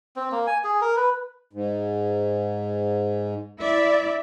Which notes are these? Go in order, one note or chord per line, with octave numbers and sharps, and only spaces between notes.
C4
A#3
G#5
G#4
A#4
B4
G#2
E4 D5 E5